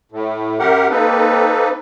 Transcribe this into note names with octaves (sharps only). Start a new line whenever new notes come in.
A2
F#2 G4 A#4 F#5
A#3 C4 D#4 A4 B4